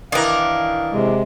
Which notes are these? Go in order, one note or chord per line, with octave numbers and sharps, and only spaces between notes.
D#3 E3 D4 A#4 F5
C3 G#3